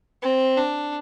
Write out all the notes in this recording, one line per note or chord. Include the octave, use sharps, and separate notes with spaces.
C4
D4